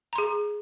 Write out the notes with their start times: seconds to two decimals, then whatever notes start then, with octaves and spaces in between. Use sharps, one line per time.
0.13 A#5
0.16 C6
0.18 G#4